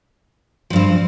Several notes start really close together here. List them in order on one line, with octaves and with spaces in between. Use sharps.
F3 G2 C4